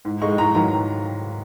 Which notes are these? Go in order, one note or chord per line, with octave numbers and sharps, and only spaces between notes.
G#2
G#3 D#4 C#6
G#2 A#5
D#3 F#3 A#5